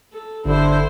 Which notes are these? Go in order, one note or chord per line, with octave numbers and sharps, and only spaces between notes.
A4
G1 D3 E4 C5